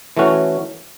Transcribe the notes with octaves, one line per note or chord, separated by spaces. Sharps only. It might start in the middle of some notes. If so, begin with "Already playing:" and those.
E3 A3 C#4 F#4